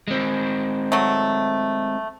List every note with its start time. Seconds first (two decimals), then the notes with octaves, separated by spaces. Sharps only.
0.08 G#3 C4
0.92 F#3 A3